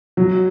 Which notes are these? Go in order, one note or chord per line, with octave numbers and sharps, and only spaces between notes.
F#3